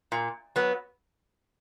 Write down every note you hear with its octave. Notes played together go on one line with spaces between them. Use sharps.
A#2
F#3 B3